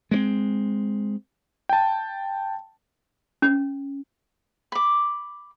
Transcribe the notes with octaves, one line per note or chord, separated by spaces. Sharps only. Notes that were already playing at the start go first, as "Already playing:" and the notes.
G#3 A3 C4
G5 A5
C#4
B5 D6